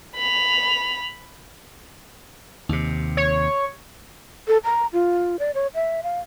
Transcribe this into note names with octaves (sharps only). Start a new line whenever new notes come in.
B5 F7
D#2 C3
C#5
A4
A#5
F4
D5
C#5
E5
F5